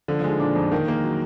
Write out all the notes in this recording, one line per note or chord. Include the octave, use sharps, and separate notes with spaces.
D3 F3
F3
G#3
D#3
A#2 D4
F2
D#3 A#3
G#3 A#3
F#3